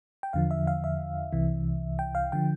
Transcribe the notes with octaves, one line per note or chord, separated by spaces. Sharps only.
G5
E2 D3 F3 F5
E5
F5
E5
C2 C3 E3
G5
F5
D3 F3 G5